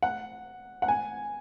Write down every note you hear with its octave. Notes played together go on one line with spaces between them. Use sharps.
F#5
F#5
G#5